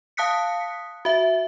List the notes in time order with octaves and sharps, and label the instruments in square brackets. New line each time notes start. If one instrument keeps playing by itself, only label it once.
[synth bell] F5 A5 D#6 F#6 B6 C#7
F#4 E5